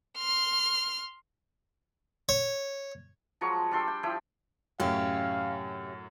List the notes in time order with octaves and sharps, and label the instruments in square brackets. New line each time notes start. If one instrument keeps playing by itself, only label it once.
[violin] C6 F6
[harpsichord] C#5
[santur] F3 F#3 G#3 C#6
G3 D4 C6 E6
G5
F3 E4 G4 G5
[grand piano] F#2 A2 [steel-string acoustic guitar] C3 C#4 G4 [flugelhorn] F5